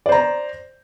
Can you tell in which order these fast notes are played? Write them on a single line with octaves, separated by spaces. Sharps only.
D5 C5 A#5